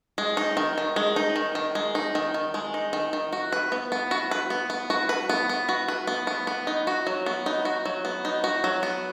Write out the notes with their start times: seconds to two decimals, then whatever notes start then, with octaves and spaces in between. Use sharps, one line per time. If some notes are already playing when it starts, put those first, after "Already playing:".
0.18 G#3
0.37 D#4
0.57 D#3
0.78 D#3
0.96 G#3
1.16 D#4
1.36 D#3
1.55 D#3
1.75 G#3
1.95 D#4
2.15 D#3
2.34 D#3
2.54 G#3
2.74 D#4
2.93 D#3
3.13 D#3
3.33 F#4
3.52 B4
3.72 B3
3.92 B3
4.11 F#4
4.31 B4
4.50 B3
4.70 B3
4.90 F#4
5.09 B4
5.29 B3
5.49 B3
5.69 F#4
5.88 B4
6.07 B3
6.27 B3
6.47 B3
6.67 D#4
6.87 F#4
7.07 F#3
7.26 B3
7.46 D#4
7.65 F#4
7.85 F#3
8.05 B3
8.25 D#4
8.44 F#4
8.64 F#3
8.83 B3